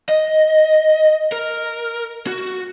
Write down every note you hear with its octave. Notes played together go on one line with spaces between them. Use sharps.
D#5
A#4
F#4